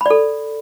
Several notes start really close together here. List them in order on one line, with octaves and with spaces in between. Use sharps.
B5 D5 A4